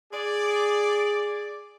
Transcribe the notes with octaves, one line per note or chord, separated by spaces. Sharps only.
G#4 D5